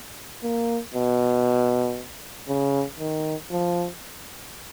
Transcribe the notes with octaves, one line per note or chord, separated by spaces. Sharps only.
A#3
B2
C#3
D#3
F3